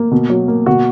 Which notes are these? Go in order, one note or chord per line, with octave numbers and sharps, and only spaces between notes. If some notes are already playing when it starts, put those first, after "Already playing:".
Already playing: A#3
B2
F#3
A#3
B2 F#4